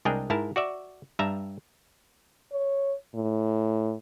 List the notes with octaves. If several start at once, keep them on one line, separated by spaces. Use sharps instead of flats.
C2 G#3 D4 G#4 A#4 G5
G#2 E4 A#4 A5
F#4 D5 E5
G2 G3 E5 A5 A#5
C#5
A2